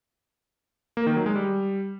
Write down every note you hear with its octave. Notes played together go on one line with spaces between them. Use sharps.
A#3
D#3
F#3
G#3
G3